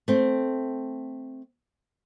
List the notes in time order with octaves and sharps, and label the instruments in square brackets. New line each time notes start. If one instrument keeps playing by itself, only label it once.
[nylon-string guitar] A3 C4